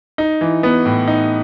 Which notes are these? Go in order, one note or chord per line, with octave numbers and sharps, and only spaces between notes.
D#4
E3
B3
A2
D#4